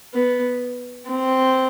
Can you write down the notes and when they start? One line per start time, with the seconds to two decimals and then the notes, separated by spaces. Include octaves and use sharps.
0.14 B3
1.09 C4